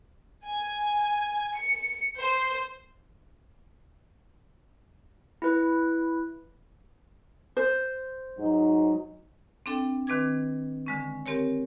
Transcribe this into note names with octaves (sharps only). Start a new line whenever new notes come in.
G#5
C#7
C5
E4 B4
C5
G#2 F#3 D#4
C4 D4 A4 G5
D#3 C4 B4 D6 G#6
D3 G#3 C#4
C4 G4 A#4 C#5